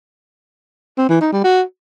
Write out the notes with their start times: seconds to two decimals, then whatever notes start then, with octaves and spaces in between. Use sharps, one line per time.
0.98 C4
1.09 E3
1.21 D#4
1.32 G3
1.44 F#4